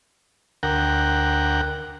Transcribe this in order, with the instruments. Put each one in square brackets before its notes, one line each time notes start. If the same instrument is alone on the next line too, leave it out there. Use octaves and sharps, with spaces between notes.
[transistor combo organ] D2 A#4 F#5 G5